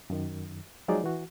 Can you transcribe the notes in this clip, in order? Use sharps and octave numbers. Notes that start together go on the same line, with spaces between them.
F#2 D#3
F3 F#3 G#3 D#4 G#4 D5
E3 F#4